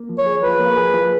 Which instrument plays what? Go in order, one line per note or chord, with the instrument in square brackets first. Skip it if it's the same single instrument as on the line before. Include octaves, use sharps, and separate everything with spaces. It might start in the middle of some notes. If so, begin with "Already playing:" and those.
Already playing: [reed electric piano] A#3
F3
[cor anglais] C#5
[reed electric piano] G#4
[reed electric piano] F3 [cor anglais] B4
[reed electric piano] A#3
G#4
F3